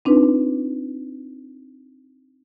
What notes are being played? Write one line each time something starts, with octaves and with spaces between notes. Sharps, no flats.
C4 D4 D#4 F4 B4